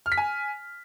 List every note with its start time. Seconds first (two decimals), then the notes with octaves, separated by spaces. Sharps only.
0.06 F6
0.12 B6
0.17 G#5